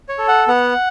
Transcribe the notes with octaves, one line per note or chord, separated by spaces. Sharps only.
C#5
A4
F#5
B3 F#5